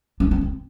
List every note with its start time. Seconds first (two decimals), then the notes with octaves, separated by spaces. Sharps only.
0.20 D4
0.31 C4
0.41 C4